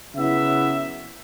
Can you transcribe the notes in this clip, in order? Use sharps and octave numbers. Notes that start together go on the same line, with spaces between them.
C#3 F#3 B3 E4 E5